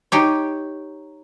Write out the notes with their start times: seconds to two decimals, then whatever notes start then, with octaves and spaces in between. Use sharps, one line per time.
0.12 D#4 G4 C#5